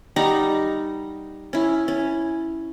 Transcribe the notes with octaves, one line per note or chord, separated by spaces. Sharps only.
G3 D#4 F#5 A#5
C#4 E4
C#4